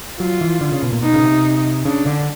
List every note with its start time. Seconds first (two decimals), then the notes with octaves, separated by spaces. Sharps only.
0.20 F#3 F4
0.41 E3
0.61 D3
0.72 C#3
0.83 B2
0.92 A#2
1.02 B2 D#4
1.14 C#3
1.24 C3
1.85 C#3 D4
2.06 D3